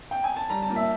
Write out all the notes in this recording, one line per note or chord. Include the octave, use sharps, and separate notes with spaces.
G5
G#5
A5
G3 A#5
A5
A#2
E5